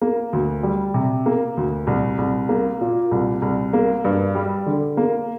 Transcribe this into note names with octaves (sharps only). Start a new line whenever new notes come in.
A#3
D2
G3
C3
A#3
D2
C2
C2
A#3
A#2
C2
C2
A#3
G2
G3
D3
A#3